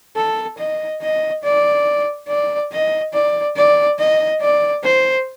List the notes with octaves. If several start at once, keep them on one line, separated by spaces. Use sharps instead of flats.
A4
D#5
D#5
D5
D5
D#5
D5
D5
D#5
D5
C5